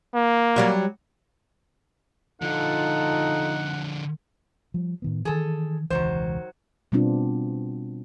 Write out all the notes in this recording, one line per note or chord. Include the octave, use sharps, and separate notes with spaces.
A#3
F#3 G3 F#4
D3 F3 D#4 F4 A4 F#5
F3 G3
A2 D#3 B3
D#3 E3 G#4 A4
E1 C#2 D#3 E3 F#3 C5
B2 G3 B3 C4 D4 F4